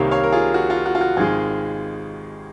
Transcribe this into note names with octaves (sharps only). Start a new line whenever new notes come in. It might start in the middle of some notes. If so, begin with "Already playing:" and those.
Already playing: C2 C3 D#3 A#3 C#5 F5
C#5 F5
A#4
F4 G#4
F#4
F4
F#4
F4
F#4
G#1 D#3 G#3 F4 G#4